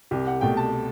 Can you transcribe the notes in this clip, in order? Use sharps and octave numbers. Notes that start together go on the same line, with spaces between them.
C2 G4
F#5
B2 A3 G5
A5